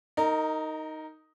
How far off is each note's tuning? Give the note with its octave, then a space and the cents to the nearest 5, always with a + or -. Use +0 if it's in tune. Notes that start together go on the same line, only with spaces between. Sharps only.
D#4 +5 A#4 -25